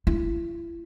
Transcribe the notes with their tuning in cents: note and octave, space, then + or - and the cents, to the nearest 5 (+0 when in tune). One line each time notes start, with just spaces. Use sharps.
E4 +40